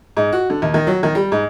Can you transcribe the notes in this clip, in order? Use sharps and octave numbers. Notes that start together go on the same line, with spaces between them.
G#2
F#4
D3
D#2
D#3
F#3
D#3
G3
G#2